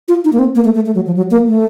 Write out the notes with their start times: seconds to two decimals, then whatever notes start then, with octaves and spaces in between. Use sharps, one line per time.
0.08 F4
0.24 D#4
0.33 A#3
0.39 C4
0.55 A#3
0.64 A3
0.75 A3
0.86 A3
0.95 F#3
1.06 F3
1.17 F#3
1.31 A#3
1.47 A3